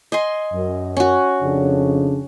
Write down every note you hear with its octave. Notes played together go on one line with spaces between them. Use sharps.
D#5 G#5 C6
F#2
C#4 F#4
F2 C#3 D4